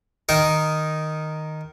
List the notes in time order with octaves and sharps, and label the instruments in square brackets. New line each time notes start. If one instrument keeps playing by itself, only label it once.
[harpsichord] D#3 D#4 A#4